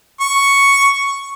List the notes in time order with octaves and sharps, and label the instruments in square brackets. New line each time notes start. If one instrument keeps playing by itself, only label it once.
[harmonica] C#6